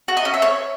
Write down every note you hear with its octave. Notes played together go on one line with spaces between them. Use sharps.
F#4
D#5
C#4
E5
C#5